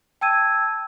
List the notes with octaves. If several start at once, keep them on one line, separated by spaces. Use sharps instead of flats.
G5 A5 E6 G#6 D#7